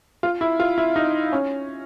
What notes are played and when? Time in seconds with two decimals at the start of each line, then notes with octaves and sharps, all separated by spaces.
0.23 F4
0.41 E4
0.60 F4
0.78 E4
0.96 D#4
1.32 C#4